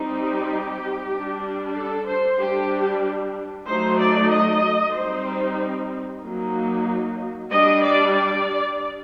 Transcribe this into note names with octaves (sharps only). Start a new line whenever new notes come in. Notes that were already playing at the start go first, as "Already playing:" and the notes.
Already playing: G3 C4 D#4
G4
G3 D4
A4
C5
G3 D4 G4
F#3 A3 D#4 C5
D5
D#5
G3 C4 D#4 C5
F#3 A#3 D#4
G3 D4 D#5
D5
D5